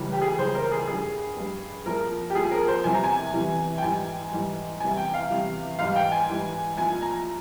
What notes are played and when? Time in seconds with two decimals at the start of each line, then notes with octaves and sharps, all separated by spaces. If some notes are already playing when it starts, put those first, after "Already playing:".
Already playing: C#2 C#3 E3 G3
0.13 G4
0.21 G#4
0.38 C#2 C#3 E3 G3 C5
0.55 A#4
0.71 G#4
0.87 G2 G3 G#4
1.37 G2 G3
1.86 C2 A#2 F3 A#4
2.30 G4
2.35 C2 A#2 F3 G#4
2.51 A#4
2.68 C5
2.84 E2 C3 E3 G3 G#5
2.94 A#5
3.04 G#5
3.33 E2 C3 E3 G3
3.78 G5
3.82 G#2 E3 G3 G#5
4.32 G#2 E3 G3
4.80 E2 C3 E3 G3 G#5
4.97 G5
5.14 F5
5.30 E2 C3 E3 G3
5.79 G#2 E3 G3 F5
5.96 G5
6.12 G#5
6.29 G#2 E3 G3
6.77 C2 A#2 F3 G#5
7.02 A#5